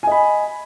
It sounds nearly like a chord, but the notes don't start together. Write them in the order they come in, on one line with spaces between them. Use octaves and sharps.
G#5 D#5 B5